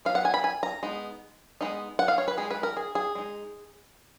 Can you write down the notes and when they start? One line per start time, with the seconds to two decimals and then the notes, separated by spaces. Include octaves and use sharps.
0.05 F#3 B3 D#4 F5
0.15 F#5
0.25 G#5
0.34 B5
0.44 G#5
0.63 A#5
0.83 G#3 B3 D#4
1.61 G#3 B3 D#4
1.99 F#5
2.08 F5
2.18 C#5
2.28 B4
2.37 G#3 D#4 G#4
2.51 B4
2.63 A#4
2.77 G#4
2.95 G#4
3.15 G#3 D#4